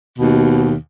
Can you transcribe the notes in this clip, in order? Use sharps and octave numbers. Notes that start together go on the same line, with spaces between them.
D#2 B2